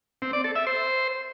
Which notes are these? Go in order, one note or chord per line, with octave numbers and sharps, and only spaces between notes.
C4
D5
A4
E5
C5